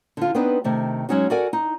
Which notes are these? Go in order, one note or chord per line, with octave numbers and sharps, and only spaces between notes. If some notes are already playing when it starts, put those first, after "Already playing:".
D3 F4
B3 C4 D4 D#4 B4
C3 D#3 A3
F#3 G#3 C#4 D#4 F#4
F#4 A4 A#4 D5 F#5 G#5
D#4